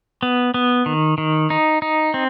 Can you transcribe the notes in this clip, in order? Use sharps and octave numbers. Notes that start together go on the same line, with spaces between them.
B3
B3
D#3
D#3
D#4
D#4
C4